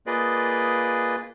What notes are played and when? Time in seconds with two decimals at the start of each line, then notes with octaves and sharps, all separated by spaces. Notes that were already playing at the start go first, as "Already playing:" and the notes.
0.06 A#3 F4 G#4 B4 D5 D#5